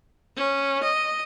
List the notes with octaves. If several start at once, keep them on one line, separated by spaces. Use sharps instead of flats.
C#4
D#5